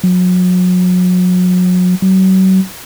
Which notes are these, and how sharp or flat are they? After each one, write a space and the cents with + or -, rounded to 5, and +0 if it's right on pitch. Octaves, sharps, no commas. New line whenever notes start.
F#3 -35
F#3 +35